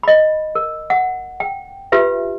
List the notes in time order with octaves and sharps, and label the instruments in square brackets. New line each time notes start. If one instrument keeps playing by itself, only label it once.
[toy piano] D#5 B5
A#4
F#5
G5
F4 G4 B4 E5